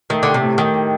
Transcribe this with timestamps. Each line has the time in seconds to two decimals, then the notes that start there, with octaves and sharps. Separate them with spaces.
0.10 D#3 A3
0.23 D3 G4
0.34 C3
0.42 A2
0.58 D#3 G4
0.74 G4